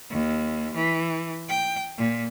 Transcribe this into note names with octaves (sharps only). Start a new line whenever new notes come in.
D#2
E3
G5
A#2